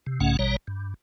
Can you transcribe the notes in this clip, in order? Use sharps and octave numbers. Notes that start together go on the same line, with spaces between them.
C3
B1 G#2 C#3 A3 C#4 F#5
A1 B2 G3 C#5 A#5
G2